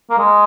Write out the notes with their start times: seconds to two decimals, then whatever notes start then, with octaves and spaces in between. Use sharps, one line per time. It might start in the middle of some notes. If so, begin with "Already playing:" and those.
0.10 A#3
0.18 G#3